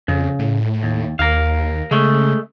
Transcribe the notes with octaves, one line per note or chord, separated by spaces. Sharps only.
F2 C#3
A2
D#2
D#2 A#4 F5
C#3 G#3 A3